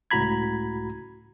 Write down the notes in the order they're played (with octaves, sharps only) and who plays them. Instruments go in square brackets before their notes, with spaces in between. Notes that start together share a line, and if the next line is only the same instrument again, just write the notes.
[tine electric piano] C#2 A2 F#4 A#5 B5 G#6